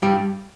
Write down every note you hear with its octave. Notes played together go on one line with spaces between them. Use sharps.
G2 G3 G4